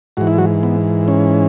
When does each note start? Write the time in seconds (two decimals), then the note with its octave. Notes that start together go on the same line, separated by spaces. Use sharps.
0.17 G#2 E3 F#4
0.27 E4
0.38 F#3 F#4
0.63 B3
1.08 C#4